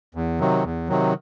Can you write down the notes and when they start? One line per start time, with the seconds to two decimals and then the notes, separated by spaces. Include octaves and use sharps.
0.15 E2
0.40 C3 D#3 F#3
0.64 E2
0.89 C3 D#3 F#3